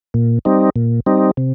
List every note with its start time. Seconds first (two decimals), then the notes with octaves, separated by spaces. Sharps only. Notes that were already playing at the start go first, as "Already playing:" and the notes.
0.14 A#2
0.45 G3 C4 D#4
0.76 A#2
1.06 G3 C4 D#4
1.37 C3